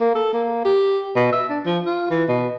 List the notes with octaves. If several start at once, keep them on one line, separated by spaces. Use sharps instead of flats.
A#3
A4
A#3
G4
B2
E5
D4
F3
F4
E3
B2